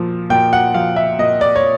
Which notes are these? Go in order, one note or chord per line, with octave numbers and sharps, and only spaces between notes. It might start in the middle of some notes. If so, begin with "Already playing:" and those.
Already playing: A#2 F3
A#2 G5
F#5
F3 F5
E5
A#2 D#5
D5
C#5